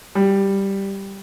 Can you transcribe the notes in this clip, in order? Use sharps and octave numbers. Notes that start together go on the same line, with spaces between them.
G3